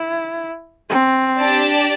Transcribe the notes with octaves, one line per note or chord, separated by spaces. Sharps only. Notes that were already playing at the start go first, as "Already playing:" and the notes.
Already playing: E4
C4
D4 G4 D5 A5